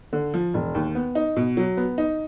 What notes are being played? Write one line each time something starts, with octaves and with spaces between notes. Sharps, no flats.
D3
F3
E1
D#2
B3
D#4
B2
F#3
B3
D#4